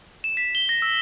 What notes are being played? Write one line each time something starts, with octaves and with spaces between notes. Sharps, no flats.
E7
B6
G7
A#6
E6